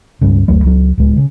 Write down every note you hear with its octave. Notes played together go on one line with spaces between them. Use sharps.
C#2 G2 C#3
F#1 D2 F#3 A3
C#2 F#3
D1 C#2 G#3
C#3